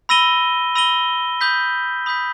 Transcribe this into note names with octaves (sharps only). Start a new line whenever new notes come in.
B5 E6 A#6 D#7 G7
B5 E6 A#6 D#7 G7
B5 D#6 G6 B6
B5 D#6 G6 B6